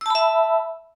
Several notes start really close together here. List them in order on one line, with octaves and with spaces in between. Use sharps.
E6 A5 B5 E5